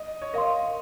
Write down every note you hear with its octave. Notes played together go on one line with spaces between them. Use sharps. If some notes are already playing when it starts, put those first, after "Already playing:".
Already playing: D#5
C#5
A#4 D#5 F5 C6